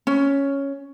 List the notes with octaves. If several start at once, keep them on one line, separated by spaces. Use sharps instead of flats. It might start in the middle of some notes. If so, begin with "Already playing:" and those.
C#4